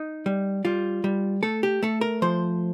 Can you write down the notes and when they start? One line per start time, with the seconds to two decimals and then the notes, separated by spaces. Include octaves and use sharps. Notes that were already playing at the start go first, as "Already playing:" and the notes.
Already playing: D#4
0.26 G3
0.65 G3 F4
1.04 G3
1.43 A3 A4
1.63 G4
1.83 A3 A4
2.01 A#4
2.22 F3 C5